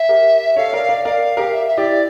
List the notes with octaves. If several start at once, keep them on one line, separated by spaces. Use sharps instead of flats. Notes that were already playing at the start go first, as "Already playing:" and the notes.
Already playing: E5
G4 A#4
A4 C#5 F5
A#4 D5
A#4 D5
A#4 D5 F5
G4 A#4
E5
E5
E4 G4 D5